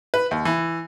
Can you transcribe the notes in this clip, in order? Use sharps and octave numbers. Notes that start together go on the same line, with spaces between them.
B4
D#2
E3